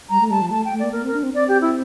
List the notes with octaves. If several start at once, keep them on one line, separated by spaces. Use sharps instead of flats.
G3 A#5
A3
G3 A5
F3
A3 A5
G5
A3
A#3 D5
A#3 A#4
C4 A#4
D4
C4
C4 D5
G4
E4